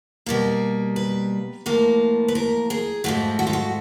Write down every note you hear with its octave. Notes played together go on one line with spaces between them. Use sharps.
B2 G3 A#3
B4
A2 F3 A#3
B4
A#4
G#4
G#2 F3 A3 F#4
F#4
F4
F#4